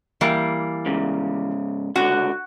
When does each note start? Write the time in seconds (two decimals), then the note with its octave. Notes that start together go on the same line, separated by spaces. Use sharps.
0.21 E3 G3 A#3
0.86 G#2 C#3
1.96 C#2 D3 F#4